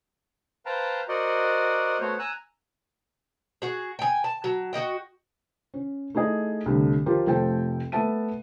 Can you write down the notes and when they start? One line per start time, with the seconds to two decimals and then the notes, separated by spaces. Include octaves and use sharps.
0.66 B4 C5 F5 G5 A5 A#5
1.08 F#4 A#4 C5 D5 D#5 F#5
2.00 A3 B3 F#4 C5 C#5
2.19 G#5 A#5 E6 F#6
3.62 F#4 G#4
3.99 G5 G#5
4.24 A5
4.44 F#3
4.73 F#4 G#4 D#5 G5
5.74 C#4
6.15 A3 D#4 E4 G#4 D#5
6.66 C2 D3 A3
7.06 F3 F4 G4 A#4
7.27 F1 F3 A3 A4 G5
7.92 A3 B3 E5 A5 D#7